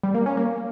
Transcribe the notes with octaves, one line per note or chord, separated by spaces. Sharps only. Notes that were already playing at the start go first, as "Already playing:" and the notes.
G3
A#3
C#4
A#3